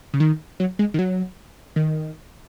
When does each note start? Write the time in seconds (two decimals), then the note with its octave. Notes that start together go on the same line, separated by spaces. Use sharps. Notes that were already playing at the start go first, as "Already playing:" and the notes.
0.14 C#3
0.20 D#3
0.60 F#3
0.79 G#3
0.94 D#3
0.99 F#3
1.76 D#3